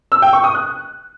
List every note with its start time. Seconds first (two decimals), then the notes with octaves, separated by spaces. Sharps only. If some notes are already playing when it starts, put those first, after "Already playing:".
0.12 E6
0.22 G5
0.33 C#6
0.44 D#6
0.55 F#6